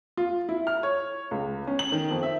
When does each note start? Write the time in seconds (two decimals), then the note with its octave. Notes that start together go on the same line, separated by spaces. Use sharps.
0.17 F4
0.49 E4
0.67 F6
0.83 C#5
1.31 C#2
1.67 C#4
1.79 F#7
1.92 D#3
2.11 F2
2.23 E5